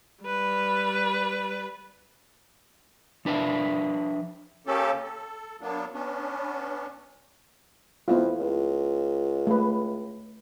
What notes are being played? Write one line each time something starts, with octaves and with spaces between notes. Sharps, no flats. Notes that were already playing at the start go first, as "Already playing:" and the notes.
G3 B4
F3 D4 B4 E5 F5
C#3 A#3 C#4 G4 A4
A4
F#3 A#3 B3 D4
B3 C#4 D4
F2 B3 E4 F4
C#2
A3 B4